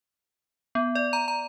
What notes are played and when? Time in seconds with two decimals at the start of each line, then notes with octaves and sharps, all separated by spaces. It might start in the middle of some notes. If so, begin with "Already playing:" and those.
0.75 B3
0.95 D5
1.13 A#5
1.28 A#5